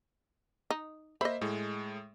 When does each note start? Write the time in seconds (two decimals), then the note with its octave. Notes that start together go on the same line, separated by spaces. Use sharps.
0.70 D#4
1.21 A#3 C5 D#5 E5 B5
1.41 A2 G#3